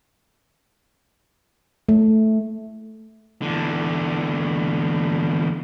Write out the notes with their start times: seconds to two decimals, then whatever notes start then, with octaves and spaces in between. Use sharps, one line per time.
1.89 A3
3.42 E2 D3